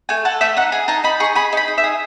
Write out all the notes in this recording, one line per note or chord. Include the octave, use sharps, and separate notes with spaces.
A3 G#5
A4 F#5
A3 E5
D#4 F#5
G#4 G#5
D#4 A5
D#4 B5
G#4 C#6
G#4 B5
D#4 B5
D#4
E5
G#4